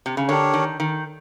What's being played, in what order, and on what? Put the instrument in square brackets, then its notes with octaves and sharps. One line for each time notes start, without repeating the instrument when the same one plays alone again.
[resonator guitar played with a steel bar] C3
C#3
[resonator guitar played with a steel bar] D3 [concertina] D4 G4 A#4 C#5
[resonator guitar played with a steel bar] D#3
D#3